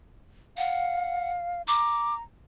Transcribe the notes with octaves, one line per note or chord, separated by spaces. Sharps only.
F5 F#5
A#5 D6